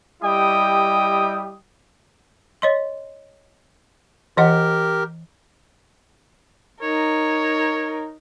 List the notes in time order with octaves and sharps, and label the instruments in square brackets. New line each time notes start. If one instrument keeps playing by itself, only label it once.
[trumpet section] G3 E4 G4 D#5 G5 D#6
[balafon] C#5 D#5 C6
[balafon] E3 D#5 F#5 [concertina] G4 A#4
[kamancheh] D#4 A#4 [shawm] C#5